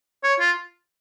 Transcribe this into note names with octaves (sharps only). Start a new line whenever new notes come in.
C#5
F4